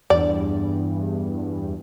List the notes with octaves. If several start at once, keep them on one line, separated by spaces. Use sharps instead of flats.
E2 G2 D5